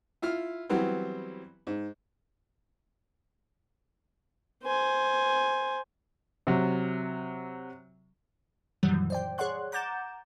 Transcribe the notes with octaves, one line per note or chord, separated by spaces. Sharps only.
E4 F4 F6
E3 F#3 G3 B3 C4
G#2
C5 G#5
C3 F#3
F#2 A#2 D#3 E3 F#3 G3
C5 D5 G5
G#4 C#5 D5 F#5 C6 F#6
F#5 A#5 D6 G6 A6 E7